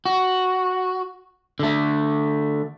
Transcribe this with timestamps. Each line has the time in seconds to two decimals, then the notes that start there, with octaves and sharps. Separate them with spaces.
0.06 F#4
1.59 D3 A3